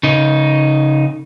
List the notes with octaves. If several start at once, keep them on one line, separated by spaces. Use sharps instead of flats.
C#3 D#4